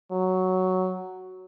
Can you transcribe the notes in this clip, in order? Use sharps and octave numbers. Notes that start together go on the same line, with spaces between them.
F#3